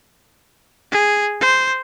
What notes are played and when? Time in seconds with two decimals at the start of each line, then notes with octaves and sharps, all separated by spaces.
0.92 G#4
1.41 C5